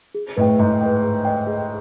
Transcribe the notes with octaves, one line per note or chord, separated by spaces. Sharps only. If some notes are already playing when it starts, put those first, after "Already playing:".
G#4
A2 B4 D#5 G5
G#2 G#4
B4 D#5 G5
G#4
B4 D#5 G5
G#4